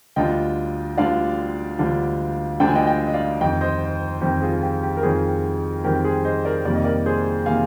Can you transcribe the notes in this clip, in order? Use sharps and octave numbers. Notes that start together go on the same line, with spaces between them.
D2 D3 G3 D4 F4 D#5 G5
D2 D3 G3 D4 F4 D5 F5
D2 D3 G3 D4 F4
D2 D3 G3 D4 F4 G5
G#5
D#5 G5
D#5 G5
D#5
D5 F5
F2 D#3 G3 C4 D#5 G5
C5 D#5
F2 D#3 G3 C4 G4
F4 G#4
F4
G4
G4
A#4
F2 D#3 G3 C4 F4 G#4
F2 D#3 G3 C4 G4 A#4
G#4 C5
C5 D#5
A#4 D5
F2 C3 D#3 G3 A#3 D5
D#5
A#4 D5
G#4 C5
C3 D#3 G3 A#3 F5 G#5